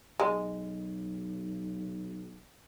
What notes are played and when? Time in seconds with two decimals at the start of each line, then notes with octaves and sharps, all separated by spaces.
0.20 B1 G#3